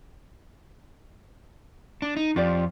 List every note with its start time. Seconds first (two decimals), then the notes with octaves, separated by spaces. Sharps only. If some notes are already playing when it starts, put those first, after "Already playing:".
2.02 D4
2.17 D#4
2.36 F2 F4 G4 D5